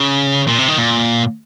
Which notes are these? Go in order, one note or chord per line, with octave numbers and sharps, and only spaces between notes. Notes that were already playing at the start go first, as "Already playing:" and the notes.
Already playing: C#3
A#2
C3
D#3
A#2